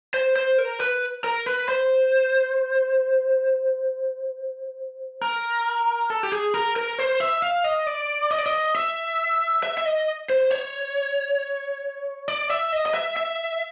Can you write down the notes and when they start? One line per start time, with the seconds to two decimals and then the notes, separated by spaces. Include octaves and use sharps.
0.14 C5
0.36 C5
0.58 A#4
0.80 B4
1.24 A#4
1.46 B4
1.69 C5
5.22 A#4
6.10 A4
6.23 G4
6.32 G#4
6.54 A#4
6.76 A#4
6.98 C5
7.20 E5
7.42 F5
7.64 D#5
7.87 D5
8.31 D#5
8.38 D5
8.46 D#5
8.75 E5
9.63 E5
9.78 E5
9.85 D#5
10.30 C5
10.51 C#5
12.28 D5
12.50 E5
12.73 D#5
12.86 D#5
12.94 E5
13.17 E5